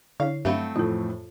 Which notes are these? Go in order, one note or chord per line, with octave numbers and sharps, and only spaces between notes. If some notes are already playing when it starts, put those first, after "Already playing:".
D3 E4 C#5 F5
G2 F#3 A3 C4 E5 F5 B5
F2 A2 E3 F4 A4